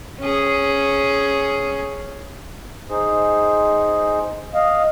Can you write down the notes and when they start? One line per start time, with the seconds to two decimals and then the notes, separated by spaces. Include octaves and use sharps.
0.20 C#4 G#4
2.90 D#4 G#4 C5
4.54 D#5 F5